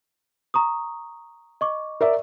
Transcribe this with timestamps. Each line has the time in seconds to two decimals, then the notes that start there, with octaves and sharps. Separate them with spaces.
0.54 A#5 C#6 D#6
1.61 D#5 C#6 D6
2.01 A#4 D5 E5